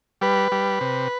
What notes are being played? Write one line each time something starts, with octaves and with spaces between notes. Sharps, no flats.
G3 B4
G3
C3